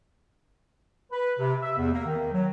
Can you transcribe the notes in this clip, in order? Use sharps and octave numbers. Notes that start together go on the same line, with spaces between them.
B4
C3
E5
E2
A#3
D#3
F#3